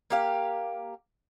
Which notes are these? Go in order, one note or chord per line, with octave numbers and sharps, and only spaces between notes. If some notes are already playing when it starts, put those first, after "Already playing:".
A#3 G4 F5